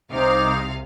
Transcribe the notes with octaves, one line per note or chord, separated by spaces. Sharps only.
C2 C3 D#4 C5 F5 D6